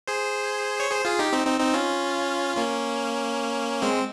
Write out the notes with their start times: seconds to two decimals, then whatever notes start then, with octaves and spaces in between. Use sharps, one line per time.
0.08 G#4 C5
0.80 C#5
0.90 G#4 C5
1.05 F4 G#4
1.19 D#4 G4
1.33 C4 D#4
1.46 C4 D#4
1.60 C4 D#4
1.74 C#4 F4
2.57 A#3 C#4
3.82 G#3 C4